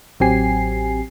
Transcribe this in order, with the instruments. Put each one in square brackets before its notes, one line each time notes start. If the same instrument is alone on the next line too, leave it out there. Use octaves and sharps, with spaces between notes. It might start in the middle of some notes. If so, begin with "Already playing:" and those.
[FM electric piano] A1 F#3 C4 G4 G#5 C7